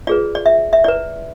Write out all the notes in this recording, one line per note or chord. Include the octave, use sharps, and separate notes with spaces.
F4 G#4 B4 D5
D5
E5
E5
E4 B4 D5